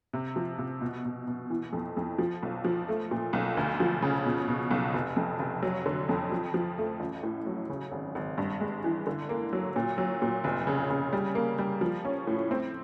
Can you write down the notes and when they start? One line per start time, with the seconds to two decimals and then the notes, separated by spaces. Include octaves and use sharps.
0.13 C3
0.36 F3
0.58 C3
0.81 B2
1.05 B2
1.27 B2
1.50 E3
1.73 F2
1.97 F2
2.18 F3
2.43 B1
2.65 F3
2.88 A3
3.11 A#2
3.33 B1
3.57 D2
3.80 F3
4.02 C#3
4.25 B2
4.48 B2
4.71 B1
4.93 F1
5.16 F2
5.39 F1
5.63 F#3
5.86 D3
6.09 F2
6.32 F3
6.54 F3
6.78 A3
7.00 A1
7.23 A2
7.46 F#3
7.70 C#3
7.92 G#1
8.15 G#1
8.38 G2
8.61 G#3
8.84 E3
9.07 D3
9.29 A#3
9.53 F#3
9.76 A#2
9.98 F#3
10.22 A#2
10.44 F1
10.67 C#3
10.90 C#3
11.13 G3
11.35 A#3
11.58 G3
11.81 F3
12.05 C#4
12.27 A2
12.51 C4